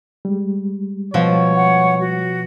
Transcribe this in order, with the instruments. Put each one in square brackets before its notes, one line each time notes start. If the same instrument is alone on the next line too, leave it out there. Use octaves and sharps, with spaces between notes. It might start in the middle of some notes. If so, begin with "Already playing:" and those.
[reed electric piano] G3 G#3
[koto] B2 F3 [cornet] C#5
[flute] F#5
F#4